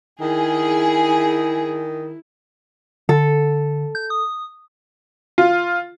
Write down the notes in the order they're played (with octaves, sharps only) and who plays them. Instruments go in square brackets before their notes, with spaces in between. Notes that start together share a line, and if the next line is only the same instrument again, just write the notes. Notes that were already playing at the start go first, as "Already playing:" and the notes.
[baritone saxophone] D#3 [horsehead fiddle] E4 [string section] G#4
[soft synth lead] D3 [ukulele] A4
[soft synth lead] G6
D#6
[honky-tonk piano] F4